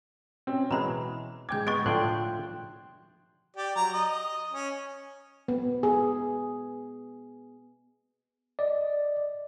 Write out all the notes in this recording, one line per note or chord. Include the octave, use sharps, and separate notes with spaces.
C4 C#4
B2 E3 F#3 G#3 A#5 B5
G#2 G5 D6 G6 G#6
G#3 B3 C#6 A6 D7
A2 D3 F3 G5 C6 F#6
G4 D5
F#3 A#5
D#5
C#4
B3
G#4
D5 D#5